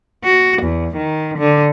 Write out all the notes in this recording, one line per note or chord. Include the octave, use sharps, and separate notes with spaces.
F#4
E2
D#3
D3